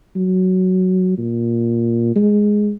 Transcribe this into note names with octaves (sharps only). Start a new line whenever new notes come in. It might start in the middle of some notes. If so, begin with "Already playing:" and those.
F#3
A#2
G#3